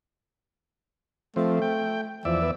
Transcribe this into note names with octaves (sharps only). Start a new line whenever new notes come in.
F3 A3 C4
G5
E2 F3 D5 E5
B3